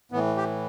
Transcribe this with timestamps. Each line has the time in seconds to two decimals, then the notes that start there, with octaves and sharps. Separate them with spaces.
0.12 A2 E3 B3
0.37 G4